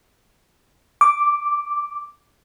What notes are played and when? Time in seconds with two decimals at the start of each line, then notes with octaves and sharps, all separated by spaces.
1.01 D6